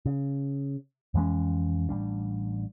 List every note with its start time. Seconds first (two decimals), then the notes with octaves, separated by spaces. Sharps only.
0.06 C#3
1.14 F2 E3 G#3 C#4
1.89 A1 D3 G3 D4